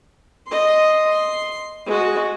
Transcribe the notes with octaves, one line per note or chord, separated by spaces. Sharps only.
D#5 C6
C6
G#3 F#4